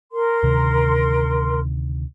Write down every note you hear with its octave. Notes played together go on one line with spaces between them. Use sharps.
A#4 C6
D2 C3 D#3